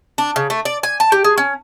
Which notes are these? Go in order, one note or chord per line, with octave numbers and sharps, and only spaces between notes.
D4
C#3
A3
D5
G#5
A5
G4
G#4
C#4